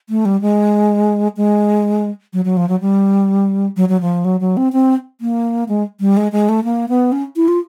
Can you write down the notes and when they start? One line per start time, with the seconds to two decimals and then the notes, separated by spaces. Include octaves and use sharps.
0.09 A3
0.25 G3
0.41 G#3
1.37 G#3
2.33 F#3
2.45 F#3
2.57 F3
2.69 F#3
2.80 G3
3.77 F#3
3.89 F#3
4.01 F3
4.25 F#3
4.40 F#3
4.57 C4
4.73 C4
5.21 A#3
5.69 G#3
6.00 G3
6.17 G#3
6.32 G#3
6.49 A3
6.64 A#3
6.89 B3
7.12 C#4
7.36 E4
7.48 F4